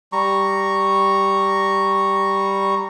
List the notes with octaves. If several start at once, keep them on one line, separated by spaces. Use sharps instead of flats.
G3 A#5 C#6